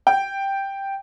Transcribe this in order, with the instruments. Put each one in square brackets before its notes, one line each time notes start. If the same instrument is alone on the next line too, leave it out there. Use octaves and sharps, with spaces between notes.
[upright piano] G5